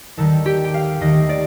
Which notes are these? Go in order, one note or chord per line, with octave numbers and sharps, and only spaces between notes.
D#2 D#3 G3 A4
G4
G5
F5
D#2 D#3 A3 D#5
D5